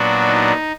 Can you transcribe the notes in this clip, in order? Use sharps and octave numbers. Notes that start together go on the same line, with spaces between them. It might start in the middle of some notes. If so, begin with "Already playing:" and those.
Already playing: A#2 F#3 B3 D4 F#4
D#4